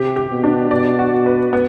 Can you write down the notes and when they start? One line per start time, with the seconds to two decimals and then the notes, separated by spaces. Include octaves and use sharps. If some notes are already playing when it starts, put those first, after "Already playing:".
Already playing: C3 G4
0.16 G4
0.30 B2
0.44 D4
0.71 B2 D5
0.99 F#4
1.12 B2
1.26 B4
1.53 B3